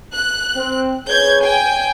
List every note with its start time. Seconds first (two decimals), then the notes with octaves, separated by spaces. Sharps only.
0.15 F#6
0.56 C4
1.08 G#4 B4 C#5 G6 G#6
1.43 G5 G#5